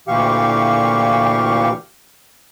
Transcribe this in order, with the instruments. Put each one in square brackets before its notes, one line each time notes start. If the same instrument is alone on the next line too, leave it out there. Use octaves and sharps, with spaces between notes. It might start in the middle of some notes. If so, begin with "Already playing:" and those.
[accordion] D2 A#2 E3 G4 F5 C#6